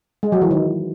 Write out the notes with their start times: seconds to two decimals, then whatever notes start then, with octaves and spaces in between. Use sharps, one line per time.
0.23 G#3
0.32 F#3
0.41 E3
0.51 D#3